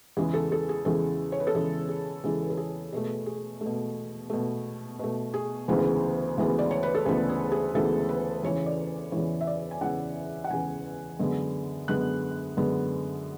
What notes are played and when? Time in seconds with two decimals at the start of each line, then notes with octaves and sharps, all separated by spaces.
0.17 E2 C#3 E3 G#3 G#4
0.33 A4
0.52 A4
0.69 G#4
0.85 E2 C#3 E3 G#3 A4
1.32 C#5
1.40 B4
1.47 A4
1.54 E2 C#3 E3 G#3 G#4
1.88 G#4
2.24 E2 C#3 E3 G#3 G#4
2.42 B4
2.50 A4
2.57 G#4
2.92 B2 A3 G#4
3.26 G#4
3.61 A3
3.66 B2
4.30 B2 A3
4.99 B2 A3
5.34 G#4
5.68 D2 C#3 E3 G#3 B3
6.37 D2 C#3 E3 G#3 B3
6.59 D5
6.71 C#5
6.83 B4
6.95 A4
7.05 D2 C#3 E3 G#3 B3 G#4
7.29 G#4
7.52 G#4
7.74 D2 C#3 E3 G#3 B3 A4
8.09 B4
8.43 E2 C#3 E3 C#5
8.66 D5
9.12 E2 C#3 E3 C#5
9.41 E5
9.47 D5
9.71 G#5
9.81 E2 C#3 E3 F#5
10.44 F#5
10.50 E2 C#3 E3 G#5
11.19 F#2 D3 G#3 B3
11.88 F#2 D3 G#3 B3 F#6
12.57 F#2 D3 G#3 B3